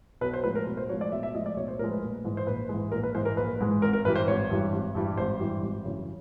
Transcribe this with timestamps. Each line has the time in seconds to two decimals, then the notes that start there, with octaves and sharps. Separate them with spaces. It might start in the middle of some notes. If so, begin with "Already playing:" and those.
0.21 B1 B4
0.34 C5
0.44 A2 F3 G#3 B4
0.55 A#4
0.66 B1
0.77 C5
0.89 A2 F3 G#3 C#5
1.01 D5
1.12 B1 E5
1.23 E5
1.35 A2 F3 G#3 D#5
1.46 D5
1.57 B1 C#5
1.68 C5
1.79 A2 A#4
1.82 F3 G#3
1.91 B4
2.02 A#1
2.24 G#2 E3 G#3
2.37 C5
2.47 A#1 B4
2.69 G#2 E3 G#3
2.92 A#1 A#4
3.03 B4
3.15 G#2 E3 G#3 C5
3.25 A#4
3.37 A#1 B4
3.60 G#2 E3 G#3
3.82 G#1 A#4
3.93 A#4
4.05 G2 E3 G3 B4
4.16 C5
4.27 G#1 C#5
4.50 G2 E3 G3
4.73 G#1
4.95 G2 E3 G3
5.18 G#1 C5
5.40 G2 E3 G3
5.62 G#1
5.85 F#2 C#3 E3